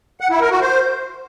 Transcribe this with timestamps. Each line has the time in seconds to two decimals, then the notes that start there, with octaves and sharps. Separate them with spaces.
0.20 F#5
0.31 E4
0.41 A#4
0.51 F#4
0.61 C5